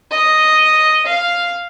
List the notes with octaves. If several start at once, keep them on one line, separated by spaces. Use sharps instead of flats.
D#5
F5